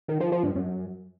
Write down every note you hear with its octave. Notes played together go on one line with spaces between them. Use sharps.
D#3
F3
F3
G2
F#2